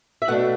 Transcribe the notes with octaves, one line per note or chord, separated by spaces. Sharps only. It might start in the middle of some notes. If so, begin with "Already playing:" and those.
E5
B2 A3 D4 F#5